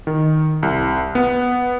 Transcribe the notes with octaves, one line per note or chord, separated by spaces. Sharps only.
D#3
C2
B3